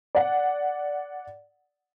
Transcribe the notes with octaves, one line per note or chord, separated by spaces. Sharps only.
D5 F#5